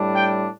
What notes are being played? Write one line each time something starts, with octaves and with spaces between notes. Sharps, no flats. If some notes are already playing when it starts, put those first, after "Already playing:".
Already playing: A2 G3 D4
G5